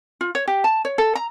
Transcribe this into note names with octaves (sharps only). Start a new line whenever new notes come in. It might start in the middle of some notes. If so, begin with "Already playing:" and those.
F4
C#5
G4
A5
C#5
A4
A#5